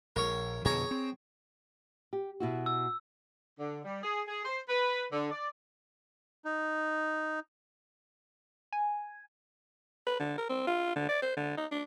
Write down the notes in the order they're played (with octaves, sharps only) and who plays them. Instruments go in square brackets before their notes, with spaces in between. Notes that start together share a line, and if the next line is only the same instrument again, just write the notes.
[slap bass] A#1 [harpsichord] A#4 C#5
[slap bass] F2 B2 D3 [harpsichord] G#4 C#5 A#5
[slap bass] C4
[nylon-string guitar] G4
B2 E4 F#4
[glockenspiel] E6
[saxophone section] D3
G3
G#4
G#4
C5
B4
D3
D5
[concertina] D#4
[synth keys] G#5
[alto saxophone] B4
D3
A#4
C4
F4
D3
D5
C5
D3
D#4
D4